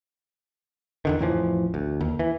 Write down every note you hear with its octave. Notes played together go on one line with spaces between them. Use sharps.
E2 D3 D#3
A1 F2 E3 F3
D2
D#2
E3